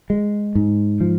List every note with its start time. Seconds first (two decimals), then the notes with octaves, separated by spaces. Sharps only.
0.10 G#3
0.55 G#2
1.00 F3